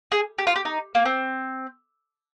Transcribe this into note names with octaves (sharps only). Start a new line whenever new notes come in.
G#4
G4
F4
G4
D#4
A#3
C4